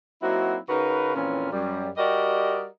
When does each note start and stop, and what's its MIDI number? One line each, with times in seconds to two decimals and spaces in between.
0.21 0.57 54
0.21 0.57 58
0.21 0.57 60
0.21 0.57 63
0.21 0.57 64
0.21 0.57 66
0.69 1.13 49
0.69 1.13 63
0.69 1.13 66
0.69 1.13 70
0.69 1.13 71
1.15 1.49 41
1.15 1.49 46
1.15 1.49 52
1.15 1.49 61
1.51 1.89 42
1.51 1.89 55
1.97 2.66 55
1.97 2.66 66
1.97 2.66 67
1.97 2.66 70
1.97 2.66 74
1.97 2.66 75